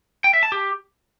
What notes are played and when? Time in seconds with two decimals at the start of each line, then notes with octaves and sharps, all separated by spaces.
0.24 G5
0.33 E5
0.43 A5
0.52 G4